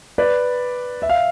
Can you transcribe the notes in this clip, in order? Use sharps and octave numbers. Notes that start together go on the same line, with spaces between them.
B4 D5
E5
F5